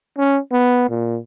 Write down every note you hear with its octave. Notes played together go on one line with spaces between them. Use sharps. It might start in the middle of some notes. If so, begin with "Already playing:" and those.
C#4
B3
A#2